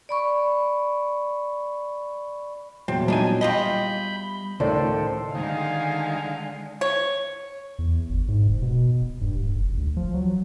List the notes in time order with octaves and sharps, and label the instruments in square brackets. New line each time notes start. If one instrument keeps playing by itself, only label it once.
[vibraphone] D5 B5 C#6
[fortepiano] E2 [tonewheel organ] A#2 F#3 [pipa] C4
[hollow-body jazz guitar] G3 G#5 [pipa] D4 D#4
[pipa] F4 G4 D#5 [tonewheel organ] B5 G6
[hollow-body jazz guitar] C#2 [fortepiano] A2 D5 [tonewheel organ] D#3 A4 C5
[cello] D3 G#3 [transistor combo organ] D#3 [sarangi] F5 [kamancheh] G#5
[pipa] C#5
[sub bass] E2
G1
G#2
E1
B2
D#1
G2
D1
F#1
D2
F3
F#3